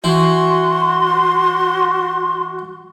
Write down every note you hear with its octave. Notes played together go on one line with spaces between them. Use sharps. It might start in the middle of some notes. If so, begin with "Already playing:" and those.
E3 E4 F#4 C6